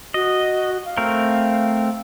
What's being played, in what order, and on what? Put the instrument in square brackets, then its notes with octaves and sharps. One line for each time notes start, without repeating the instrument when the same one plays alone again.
[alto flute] F#4 [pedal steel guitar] D#5
[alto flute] F5
[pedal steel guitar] A3 C4 A#4